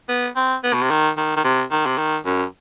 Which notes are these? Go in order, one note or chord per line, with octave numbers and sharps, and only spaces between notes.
B3
C4
B3
B2
C3
D#3
D#3
D#3
C3
D#3
C3
D#3
F#2